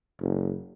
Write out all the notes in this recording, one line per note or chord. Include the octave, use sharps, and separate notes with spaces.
F#1